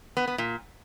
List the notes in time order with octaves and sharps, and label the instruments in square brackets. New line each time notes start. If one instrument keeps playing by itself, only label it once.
[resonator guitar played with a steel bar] B3
B3
A#2